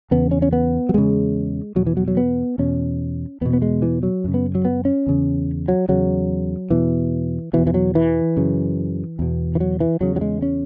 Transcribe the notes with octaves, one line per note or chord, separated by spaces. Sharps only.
E2 C#3 B3
C#4
C#4
B3
F#3
E2 C#3 G#3
E2 B2 F#3
E3
F#3
F#3
B3
E2 B2 C#4
E2 B2 B3
B3
G#3
E3
F#3
F#2 C#3
B3
F#3
B3
C#4
E2 C#3
F#3
E2 C#3 F#3
E2 B2 E3
E2 B2 E3
E3
F#3
E3
F#2 C#3
E2 B2
E3
F#3
E3
E2 C#3 F#3
F#3
G#3
C#4